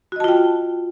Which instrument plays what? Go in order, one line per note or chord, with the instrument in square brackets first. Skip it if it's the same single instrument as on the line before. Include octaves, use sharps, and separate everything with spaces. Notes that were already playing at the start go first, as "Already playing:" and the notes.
[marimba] F#4
D#5
A5
F4
G5